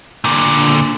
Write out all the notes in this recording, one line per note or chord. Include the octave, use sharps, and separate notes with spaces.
A#2 D3